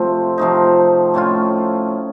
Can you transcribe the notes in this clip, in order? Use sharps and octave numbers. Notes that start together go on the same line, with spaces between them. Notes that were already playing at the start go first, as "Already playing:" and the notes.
Already playing: C3 F3 A3 C4
C3 F3 A3 D#4
A2 A3 C#4 F4